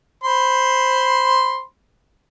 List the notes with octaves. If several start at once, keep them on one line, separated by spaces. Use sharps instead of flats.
C5 B5 C6